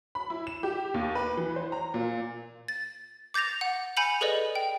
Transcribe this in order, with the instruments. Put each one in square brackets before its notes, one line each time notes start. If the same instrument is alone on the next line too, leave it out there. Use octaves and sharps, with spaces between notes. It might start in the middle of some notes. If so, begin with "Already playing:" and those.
[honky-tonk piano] B5
E4
E7
G4
D#2
B4
E3
C5
A#5
A#2
[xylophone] A6
D6 G6 A6 A#6 F7
F#5
G#5 B5 G6 C#7 F7 F#7
G#4 A4 B4 D5 D#5
G5